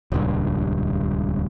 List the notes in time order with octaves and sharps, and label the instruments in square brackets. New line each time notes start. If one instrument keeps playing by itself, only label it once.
[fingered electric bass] D#1 C#2 G2